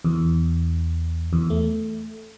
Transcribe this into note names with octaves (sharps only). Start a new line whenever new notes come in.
E2
E2
A3